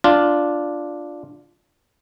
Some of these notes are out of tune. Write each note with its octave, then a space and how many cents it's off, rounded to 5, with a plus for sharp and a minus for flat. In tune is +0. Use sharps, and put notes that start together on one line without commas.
D4 +0 F4 +0